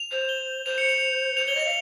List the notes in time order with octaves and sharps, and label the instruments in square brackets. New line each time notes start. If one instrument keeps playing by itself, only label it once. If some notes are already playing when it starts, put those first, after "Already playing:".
Already playing: [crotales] F7
[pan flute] C5
[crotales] G7
[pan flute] C5 [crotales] F7
[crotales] C#7
F7
[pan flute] C5 [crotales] F7
[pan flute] C#5 [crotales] G7
[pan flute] D#5 [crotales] F7
[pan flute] F5